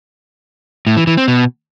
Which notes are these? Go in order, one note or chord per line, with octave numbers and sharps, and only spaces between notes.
A2
E3
E3
C4
B2